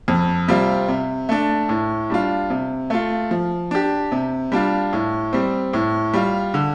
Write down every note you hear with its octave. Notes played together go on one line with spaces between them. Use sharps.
F2
C3 G3 C4 F4
C3
A3 D4
A2
G3 D4 F4
C3
A3 F4
F3
D4 G4
C3
G3 D4 F4
A2
G3 C4
A2
G3 F4
D3